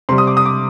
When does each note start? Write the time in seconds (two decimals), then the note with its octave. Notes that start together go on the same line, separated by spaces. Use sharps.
0.09 C3 C6
0.12 G3
0.18 D#6
0.27 D6
0.37 D#6
0.46 D6